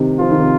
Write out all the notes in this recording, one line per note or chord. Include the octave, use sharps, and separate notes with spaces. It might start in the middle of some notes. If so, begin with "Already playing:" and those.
Already playing: C3 D#3
F3 F4
D#3
C3